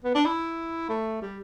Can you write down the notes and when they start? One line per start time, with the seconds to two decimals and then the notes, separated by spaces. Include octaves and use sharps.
0.04 B3
0.15 D4
0.26 E4
0.89 A3
1.22 G3